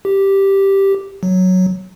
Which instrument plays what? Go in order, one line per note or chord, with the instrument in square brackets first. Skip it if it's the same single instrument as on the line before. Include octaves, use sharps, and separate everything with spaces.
[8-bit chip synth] G4
F#3